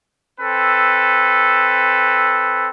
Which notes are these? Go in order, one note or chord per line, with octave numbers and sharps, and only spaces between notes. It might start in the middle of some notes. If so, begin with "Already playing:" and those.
C4 A4 B4